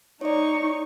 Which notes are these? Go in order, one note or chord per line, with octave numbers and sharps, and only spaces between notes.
D#4 C#5 D5 C#6